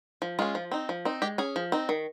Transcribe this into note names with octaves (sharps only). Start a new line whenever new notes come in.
F3
G#3 C#4 F4
F3
C4 D#4
F3
C4 D#4
G#3 G4
C#4 G#4
F3
C4 D#4
D#3